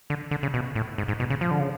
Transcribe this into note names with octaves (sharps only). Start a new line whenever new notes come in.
D3
D3
C#3
B2
A2
G#2
G#2
B2
C#3
F3
D3
C#3